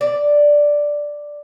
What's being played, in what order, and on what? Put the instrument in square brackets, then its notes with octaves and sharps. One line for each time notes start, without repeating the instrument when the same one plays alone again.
[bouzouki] D5